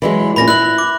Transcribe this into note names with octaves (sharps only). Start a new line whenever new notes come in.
E3 F#3 G#3
A#2 C#4 B5 A#6
E4 F#6 F#7
D6